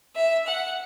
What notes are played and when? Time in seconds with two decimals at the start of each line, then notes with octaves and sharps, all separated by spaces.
0.15 E5
0.46 F#5